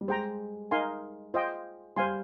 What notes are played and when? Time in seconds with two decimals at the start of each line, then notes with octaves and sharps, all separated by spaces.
0.01 G3
0.08 G#3 C5 G5 A#5
0.71 D#4 A#4 F5 G#5 C6
1.34 F4 C5 D#5 G5
1.96 G3 C5 F5 G#5 C6